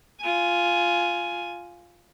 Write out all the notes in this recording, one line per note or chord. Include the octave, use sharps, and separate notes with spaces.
F4 G#5